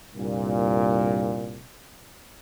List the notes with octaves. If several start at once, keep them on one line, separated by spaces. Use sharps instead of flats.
C2 G2 A#2